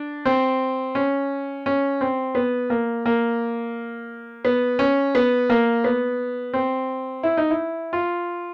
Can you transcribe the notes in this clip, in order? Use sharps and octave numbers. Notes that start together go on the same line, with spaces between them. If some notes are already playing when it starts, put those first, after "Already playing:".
Already playing: D4
C4
C#4
C#4
C4
B3
A#3
A#3
B3
C#4
B3
A#3
B3
C4
E4
D#4
E4
F4